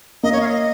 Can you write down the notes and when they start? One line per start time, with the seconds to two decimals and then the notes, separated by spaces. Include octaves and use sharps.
0.23 A#3 D#5
0.32 C#5
0.41 F5
0.46 D#5